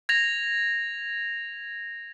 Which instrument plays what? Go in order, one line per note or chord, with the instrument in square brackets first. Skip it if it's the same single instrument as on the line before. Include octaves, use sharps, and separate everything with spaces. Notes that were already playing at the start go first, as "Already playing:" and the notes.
[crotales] G#6 A#6 F7